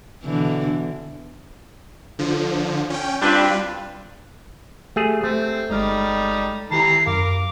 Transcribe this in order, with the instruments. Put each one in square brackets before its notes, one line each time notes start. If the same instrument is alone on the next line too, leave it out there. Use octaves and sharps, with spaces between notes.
[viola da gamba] B2 D3 E3
[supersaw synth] D3 F3
C#4 G5
[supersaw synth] G3 F4 [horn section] C4 D4 B4
[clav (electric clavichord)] A3 G#4 [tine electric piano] G4
[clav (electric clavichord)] A3 [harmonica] C4
[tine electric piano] G1 G#3 F6 [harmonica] G3 D#4 D5
[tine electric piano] D#3 G4 [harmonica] E3 A#5 B5 [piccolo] C7
[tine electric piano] F#2 F5 [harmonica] A#4 [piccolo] D6